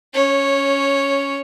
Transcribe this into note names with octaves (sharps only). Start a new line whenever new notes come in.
C#4 C#5